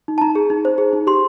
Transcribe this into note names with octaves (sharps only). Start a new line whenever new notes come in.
D#4
A5
D#4 A#5
G#4
D#4
C5
G#4
D#4
G4 C6